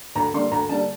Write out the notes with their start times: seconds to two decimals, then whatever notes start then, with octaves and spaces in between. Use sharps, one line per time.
0.15 D2 A#5
0.33 D3 G3 A#3 C6
0.51 D2 A#5
0.69 D3 G3 A#3 A5